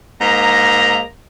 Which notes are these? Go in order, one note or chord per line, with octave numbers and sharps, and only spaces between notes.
G#2 A#3 A#5